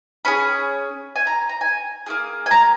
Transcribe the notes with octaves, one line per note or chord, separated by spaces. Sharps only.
C#4 G#4 B5
G#5
A#5
A#5
G#5
A#3 E4 G#4
G#5
A#5